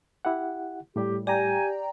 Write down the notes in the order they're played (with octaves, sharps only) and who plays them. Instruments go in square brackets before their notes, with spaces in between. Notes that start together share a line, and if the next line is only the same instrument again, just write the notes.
[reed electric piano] E4 G4 F#5
[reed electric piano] A2 G3 [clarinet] G4
[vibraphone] G4 [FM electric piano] D5 G5 A#5 [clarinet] G#5